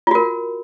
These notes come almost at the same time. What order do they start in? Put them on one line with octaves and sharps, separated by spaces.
F4 F#4 A#4